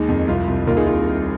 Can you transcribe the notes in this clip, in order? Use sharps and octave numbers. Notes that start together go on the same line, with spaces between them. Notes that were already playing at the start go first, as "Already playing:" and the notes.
Already playing: D#2 G#3 D#4 G#4
F2
C2 F4
C2
D#2 F4 A#4
D#4 G#4
F4